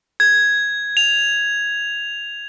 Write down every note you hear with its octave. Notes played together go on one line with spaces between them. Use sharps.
G#6
F7